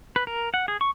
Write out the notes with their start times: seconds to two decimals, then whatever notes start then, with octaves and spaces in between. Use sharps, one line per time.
0.16 B4
0.27 A#4
0.54 F#5
0.68 G#4
0.81 C#6